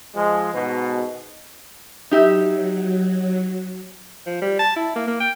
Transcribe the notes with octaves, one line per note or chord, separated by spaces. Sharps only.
F3 G#3
G#2 B2
F#3 D#4 G4 E5
F3
G3
A5
E4
A#3
A#3
G5